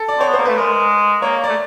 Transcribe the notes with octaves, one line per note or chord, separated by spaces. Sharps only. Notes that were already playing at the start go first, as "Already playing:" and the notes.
Already playing: A4
D5
C4 C#5
B3
A#3 C5
A3 B4
G#3 A#4
A#3 C#5
D5
A3